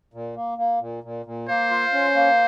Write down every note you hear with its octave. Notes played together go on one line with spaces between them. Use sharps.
A#2
A#3
A#3
A#2
A#2
A#2
A#3 C5
F4
C#4
A#3